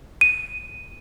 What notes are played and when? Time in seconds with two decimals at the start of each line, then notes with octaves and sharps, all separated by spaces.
0.21 D#7